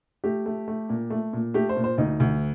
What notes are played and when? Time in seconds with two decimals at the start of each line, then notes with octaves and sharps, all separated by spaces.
0.24 A3 G4
0.46 A3
0.68 A3
0.89 A#2
1.10 A3
1.33 A#2
1.54 A3 G4
1.69 C5
1.77 A#2
1.84 C5
1.98 D2 D#4
2.20 D2